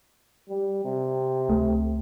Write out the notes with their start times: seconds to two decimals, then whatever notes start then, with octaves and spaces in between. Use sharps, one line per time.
0.49 G3
0.85 C3
1.49 C#2 A3